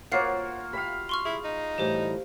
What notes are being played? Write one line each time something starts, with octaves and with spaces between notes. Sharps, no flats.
A#3 F4 F#4 C5 C#5 F5 F#5 C7
G4 E5 F5 G5 B5
C6 C#6 F6
E4 G#4
D#4
A2 E3 G3 G4 C5